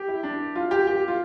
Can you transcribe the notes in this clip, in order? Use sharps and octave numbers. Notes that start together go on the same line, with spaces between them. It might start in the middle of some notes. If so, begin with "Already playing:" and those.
Already playing: G4
E4
D4
F4
G4
G4
F4